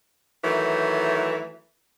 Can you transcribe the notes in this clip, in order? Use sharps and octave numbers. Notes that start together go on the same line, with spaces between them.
D#3 E3 F#3 A3